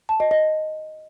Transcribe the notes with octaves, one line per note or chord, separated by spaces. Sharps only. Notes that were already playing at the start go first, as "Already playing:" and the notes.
A5
D#5
D#5